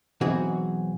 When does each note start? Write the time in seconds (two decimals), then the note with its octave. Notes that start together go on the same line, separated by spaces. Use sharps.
0.21 B1 E3 C4 F#4 G#4